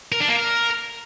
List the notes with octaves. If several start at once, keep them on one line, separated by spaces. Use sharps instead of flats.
A#4
D4
A#3
A#4